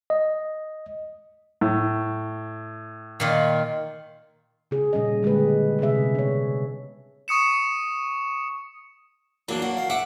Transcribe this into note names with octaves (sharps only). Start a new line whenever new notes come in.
D#5
A2
A#2 D#3 F4
C#3 G#4
A#2 G3 C#4 D#5
D3 G#3 G4 B4
C3 G#3 B3 G#4 E5
D4 C#5
C#6 D#6 C#7 E7
E3 F#3 A#3 D4
F#4
F5
E5 F#5 D6